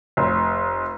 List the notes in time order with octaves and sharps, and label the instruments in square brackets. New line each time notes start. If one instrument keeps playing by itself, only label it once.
[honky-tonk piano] F1